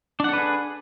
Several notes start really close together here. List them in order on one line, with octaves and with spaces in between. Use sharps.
D4 F#5 A4 B4 G#4